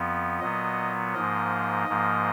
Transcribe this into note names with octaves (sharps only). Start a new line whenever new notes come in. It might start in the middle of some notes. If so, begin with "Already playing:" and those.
Already playing: F2 F3 B3
A#2 F#3 B3 D#5
G#2 F3 A#3 D#5
G#2 F3 A#3